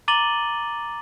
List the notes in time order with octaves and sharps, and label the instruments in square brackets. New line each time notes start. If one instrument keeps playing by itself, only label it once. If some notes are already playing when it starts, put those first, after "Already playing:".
[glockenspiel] A#5 D6 A6 D#7 F#7 G7